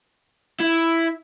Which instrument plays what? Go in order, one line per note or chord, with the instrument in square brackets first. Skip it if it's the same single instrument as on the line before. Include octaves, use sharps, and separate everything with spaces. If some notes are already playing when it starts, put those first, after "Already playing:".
[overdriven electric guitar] E4